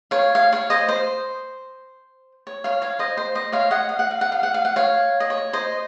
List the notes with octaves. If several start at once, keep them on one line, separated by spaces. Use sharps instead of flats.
C#5 F5
C#5 F5
C#5 F5
C5 D#5
C5
C#5
C#5 F5
C#5 F5
C5 D#5
C5
C5 D#5
C#5 F5
D#5 F#5
F5
F#5
F5
F#5
F5
F#5
F5
F#5
C#5 F5
D#5
C#5
C5 D#5